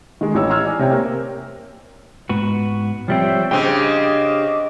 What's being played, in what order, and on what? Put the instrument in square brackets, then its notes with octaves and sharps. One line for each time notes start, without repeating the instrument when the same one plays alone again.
[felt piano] D#3 G#3
A1 D#4 C#5 E6
A#5 C6 E6 F6 G#6
D5 G#5
C3 C#5 G5
A#3
[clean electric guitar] G#2 B3 F#4
[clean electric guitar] F3 G3 C4 [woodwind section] C#5 E5 G5
[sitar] C#3 C4 [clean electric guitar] D4 G4 G5 [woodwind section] D#5 D6